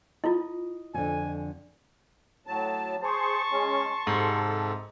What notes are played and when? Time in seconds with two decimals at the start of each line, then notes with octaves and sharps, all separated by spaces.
0.24 E4 F4 D#5
0.94 F2 D3 G#5
2.47 A2 F#3 A5
3.02 G#4 C5 A5 C6 C#6
3.51 G#3 C#4
4.07 G#2 C3 A4